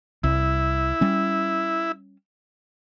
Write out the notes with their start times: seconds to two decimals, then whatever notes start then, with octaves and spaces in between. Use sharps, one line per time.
0.24 C2 E4
1.01 G3 C#4